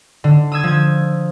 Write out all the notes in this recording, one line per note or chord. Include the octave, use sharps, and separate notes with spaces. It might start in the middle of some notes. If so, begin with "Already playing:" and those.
D3
D#6 E6 G#6
F3 G#6